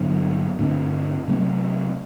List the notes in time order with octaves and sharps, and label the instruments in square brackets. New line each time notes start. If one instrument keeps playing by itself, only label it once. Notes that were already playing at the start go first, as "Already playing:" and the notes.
Already playing: [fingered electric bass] G2 D3 F#3 B3
G2 D3 A3 C4
C3 F#3 A3 C4